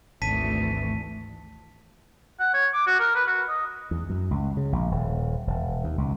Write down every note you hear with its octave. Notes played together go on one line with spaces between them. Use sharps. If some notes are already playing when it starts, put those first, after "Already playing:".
G#1 D2 E3 A3 A5 B6 D#7
F#5
C#5
D6
F#4
A#4
B4
F#4
D#5
E2
F#2
C#2
C#3
A#1
D#1
E1
D#2
C#2